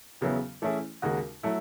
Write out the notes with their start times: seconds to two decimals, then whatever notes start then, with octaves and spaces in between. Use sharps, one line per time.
0.21 E2 C#3 F#3 B3 E4
0.62 E3 A3 C#4 E4 G#4
1.02 D#2 C#3 G#3 D#4 F#4
1.43 F#3 A3 E4